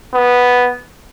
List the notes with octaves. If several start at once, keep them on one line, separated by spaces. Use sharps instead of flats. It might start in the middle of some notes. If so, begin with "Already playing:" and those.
B3